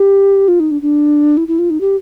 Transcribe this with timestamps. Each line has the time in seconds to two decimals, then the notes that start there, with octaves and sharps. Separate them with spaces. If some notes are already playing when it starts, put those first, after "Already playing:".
Already playing: G4
0.48 F4
0.60 D#4
0.71 D4
0.82 D4
1.37 E4
1.48 E4
1.59 F4
1.70 D#4
1.81 G4